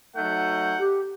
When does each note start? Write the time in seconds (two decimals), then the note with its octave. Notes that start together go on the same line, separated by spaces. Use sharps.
0.16 F#3 A3 D#4 F#5 G6
0.79 G4